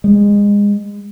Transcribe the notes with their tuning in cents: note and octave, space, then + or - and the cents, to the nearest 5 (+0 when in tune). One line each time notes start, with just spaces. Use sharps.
G#3 -25